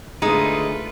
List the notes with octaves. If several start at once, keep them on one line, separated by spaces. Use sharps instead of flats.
D3 G#3 A3 D#4 F4 G#4 B4